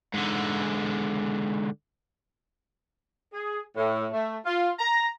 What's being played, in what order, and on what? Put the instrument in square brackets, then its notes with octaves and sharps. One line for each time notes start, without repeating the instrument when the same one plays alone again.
[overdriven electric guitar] G#2 D3
[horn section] G#4
A2
A3
F4
A#5